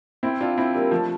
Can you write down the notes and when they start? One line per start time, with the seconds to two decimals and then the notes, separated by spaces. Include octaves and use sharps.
0.23 C4 E4
0.41 D4 F4
0.58 C4 E4
0.74 G3 A#3
0.91 F3 A3